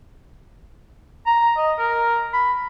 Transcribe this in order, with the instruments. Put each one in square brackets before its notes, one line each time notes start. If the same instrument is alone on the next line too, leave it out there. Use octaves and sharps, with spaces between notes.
[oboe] A#5
D#5
A#4
B5